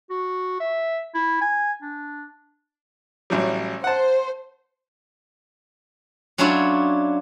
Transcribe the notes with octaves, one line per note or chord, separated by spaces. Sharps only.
F#4
E5
E4
G#5
D4
A1 F#3 G3
C5 F#5 A5
F#3 C#4 D4 E4 F4 C#5